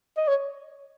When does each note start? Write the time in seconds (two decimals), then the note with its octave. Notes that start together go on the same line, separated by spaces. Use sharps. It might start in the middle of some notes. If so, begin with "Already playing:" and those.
0.17 D#5
0.28 C#5